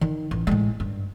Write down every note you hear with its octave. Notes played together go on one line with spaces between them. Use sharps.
D#3
A1
A2 G#3
G2